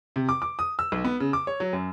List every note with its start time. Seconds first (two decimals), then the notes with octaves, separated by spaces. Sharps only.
0.16 C3
0.29 D6
0.42 D6
0.59 D#6
0.79 E6
0.92 B1
1.04 B3
1.20 C#3
1.33 D6
1.47 C#5
1.60 F#3
1.73 F#2